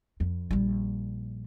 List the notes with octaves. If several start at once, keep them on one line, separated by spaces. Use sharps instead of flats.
F2
A#1 G3